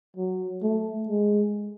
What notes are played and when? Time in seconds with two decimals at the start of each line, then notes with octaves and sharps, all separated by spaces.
0.17 F#3
0.63 A3
1.09 G#3